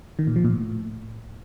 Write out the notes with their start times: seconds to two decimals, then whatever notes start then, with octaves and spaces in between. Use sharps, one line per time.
0.19 D#3
0.27 A#2
0.36 F3
0.45 A#2
0.53 A2